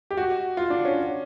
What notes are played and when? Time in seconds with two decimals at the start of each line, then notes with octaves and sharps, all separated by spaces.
0.11 G4
0.17 F#4
0.57 F4
0.70 D4
0.85 C#4